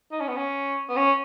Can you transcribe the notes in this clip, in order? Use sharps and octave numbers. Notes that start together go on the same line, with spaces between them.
D#4
C#4
B3
C#4
B3
C#4